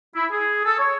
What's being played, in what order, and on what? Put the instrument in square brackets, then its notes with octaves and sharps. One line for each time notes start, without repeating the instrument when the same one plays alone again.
[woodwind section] E4
G#4
A4
C#5